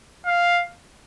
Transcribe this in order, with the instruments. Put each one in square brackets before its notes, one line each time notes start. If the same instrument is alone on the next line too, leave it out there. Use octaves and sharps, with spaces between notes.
[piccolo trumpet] F5